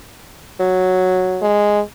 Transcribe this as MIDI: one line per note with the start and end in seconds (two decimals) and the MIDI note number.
0.59 1.44 54
1.42 1.81 56